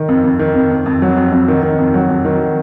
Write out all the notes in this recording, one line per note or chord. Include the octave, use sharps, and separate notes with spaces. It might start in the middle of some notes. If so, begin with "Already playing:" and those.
Already playing: D#3
F2
F2
D#3
F2
F2
F2
F#3
F2
F2
D#3
D#3
F2
F#3
F2
D#3